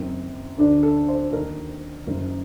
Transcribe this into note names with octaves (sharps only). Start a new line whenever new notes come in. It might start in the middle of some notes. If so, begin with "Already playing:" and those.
Already playing: F#1 F#2 D#3 C4
D2 D3 D4
A4
C5
D#2 D#3 A#4
F#1 F#2 D#3